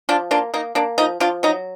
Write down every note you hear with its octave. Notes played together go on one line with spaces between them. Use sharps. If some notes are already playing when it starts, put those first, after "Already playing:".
F3 D4 F4
A#3 D4 F4
A#3 D#4
A#3 D4
F3 D#4
F3 D4 F4
F#3 D#4